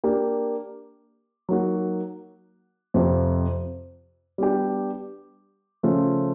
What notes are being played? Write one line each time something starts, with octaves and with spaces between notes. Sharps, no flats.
A#3 D4 G4
F#3 A#3 D#4 F#4
F2 C3 F3
G3 B3 D4 G4
C#3 F3 A3 C#4 F4